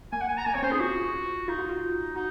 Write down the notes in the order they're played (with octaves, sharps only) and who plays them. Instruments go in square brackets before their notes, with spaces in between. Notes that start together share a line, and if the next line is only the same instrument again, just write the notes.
[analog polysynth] A#3 [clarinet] G#5
[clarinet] F#5
G#5
A#5
[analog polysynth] A#3 [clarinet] G#5
[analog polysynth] C4 [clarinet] C#5
[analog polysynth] C#4 [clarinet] C5
[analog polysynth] D#4 [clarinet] G#4
[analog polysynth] F4 [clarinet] F#4
[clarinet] D#4 [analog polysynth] F4
[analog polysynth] F#4
F4
[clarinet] D#4 [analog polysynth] F#4